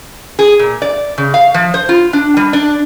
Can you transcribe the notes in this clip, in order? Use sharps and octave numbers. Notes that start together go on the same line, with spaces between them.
G#4
A#2
D5
C#3
F5
F3
C5
F4
D4
G3
D4